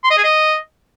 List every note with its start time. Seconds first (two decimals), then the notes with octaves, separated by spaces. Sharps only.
0.04 C6
0.11 D#5
0.17 G#4
0.24 D#5